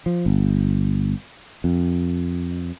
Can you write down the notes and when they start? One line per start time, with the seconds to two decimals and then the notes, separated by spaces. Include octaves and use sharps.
0.06 F3
0.26 G1
1.64 F2